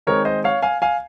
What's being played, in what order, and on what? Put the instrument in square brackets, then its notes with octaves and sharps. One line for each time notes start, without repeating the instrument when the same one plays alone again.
[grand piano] D#3 G#3 C4 D#4 A#4 C#5
C5 D#5
C#5 F5
F5 G#5
F5 G#5